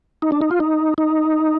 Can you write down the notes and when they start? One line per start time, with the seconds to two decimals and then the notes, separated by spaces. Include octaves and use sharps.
0.22 D#4
0.32 D4
0.41 D#4
0.51 F4
0.60 D#4
0.98 D#4